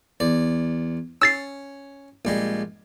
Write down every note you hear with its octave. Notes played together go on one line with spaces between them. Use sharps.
E2 D5
C#4 E6 A6 C7
A#1 G3 G#3